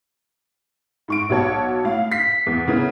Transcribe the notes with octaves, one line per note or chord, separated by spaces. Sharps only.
G#2 C#6 D7
B1 F#4 C#5 A5
A2 F5
B6 C7
E2
C#3 B3 C#4 E4